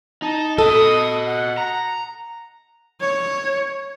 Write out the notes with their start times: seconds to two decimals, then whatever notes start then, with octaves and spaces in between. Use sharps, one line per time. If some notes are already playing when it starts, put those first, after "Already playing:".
0.22 D#4 A5
0.58 F#4 A4 D#5 D#6
1.26 F#5
1.58 A#5
3.00 C#5